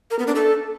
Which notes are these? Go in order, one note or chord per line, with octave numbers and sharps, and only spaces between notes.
A#4
B3
D4
A4